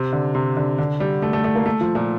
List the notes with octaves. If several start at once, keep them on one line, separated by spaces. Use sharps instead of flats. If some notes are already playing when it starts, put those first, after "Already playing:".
Already playing: C3
D3
C3
D3
D3
G3
A3
A3
A3
A#3
A3
F3
A#2